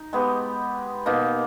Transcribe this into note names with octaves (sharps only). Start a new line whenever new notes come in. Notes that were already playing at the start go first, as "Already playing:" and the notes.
Already playing: D#4
G#3 B3 G4
B2 A#3 D#4